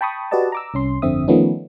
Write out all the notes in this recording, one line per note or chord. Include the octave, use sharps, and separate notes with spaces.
G5 A5 B5 C#6 D#6
F#4 G4 B4 D5 D#5 A5
A#5 D6 E6
C2 C#4 C6
G1 F2 D3 C4 E5 D#6
D#3 F3 A3 B3 C#4 D#4